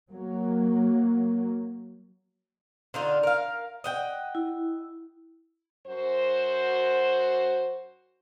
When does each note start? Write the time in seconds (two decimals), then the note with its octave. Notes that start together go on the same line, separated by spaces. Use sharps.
0.11 F#3 A#3
2.94 D3 D#4 F4
3.23 A#4 F5
3.84 D#5 F#5 G5
4.35 E4
5.86 F#2 F#4 C5